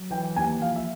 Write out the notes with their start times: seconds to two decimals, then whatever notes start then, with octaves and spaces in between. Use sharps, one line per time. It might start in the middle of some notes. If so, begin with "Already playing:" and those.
Already playing: F#3
0.10 E3 G5
0.36 D#2 G#5
0.61 F3 F5
0.76 E5